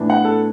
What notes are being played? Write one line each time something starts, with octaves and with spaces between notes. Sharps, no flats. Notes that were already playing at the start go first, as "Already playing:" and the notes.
Already playing: A2 E3 B3 D4
F#5
A4